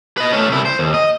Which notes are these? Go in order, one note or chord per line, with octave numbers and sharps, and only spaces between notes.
B4 D#5
A3 C#4
C2 E4
C5
D#2
D#5